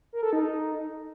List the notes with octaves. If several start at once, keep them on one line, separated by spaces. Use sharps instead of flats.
A#4
A4
D#4